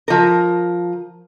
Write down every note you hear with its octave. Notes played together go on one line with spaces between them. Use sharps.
F3 A#4